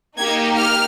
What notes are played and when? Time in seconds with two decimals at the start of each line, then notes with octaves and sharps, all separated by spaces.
0.18 A#3 D#4 G4 G#6
0.57 F6